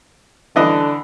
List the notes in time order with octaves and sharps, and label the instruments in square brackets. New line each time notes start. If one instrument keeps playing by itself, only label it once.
[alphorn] D3 [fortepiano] E3 D4 D#5